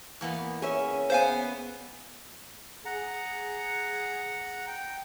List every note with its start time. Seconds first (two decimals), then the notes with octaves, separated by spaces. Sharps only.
0.21 E2 A#3 B3
0.62 C#4 G#4 C#5 E5
1.10 B3 C5 F5 G#5
2.85 G#4 F#5 A#5
4.68 G5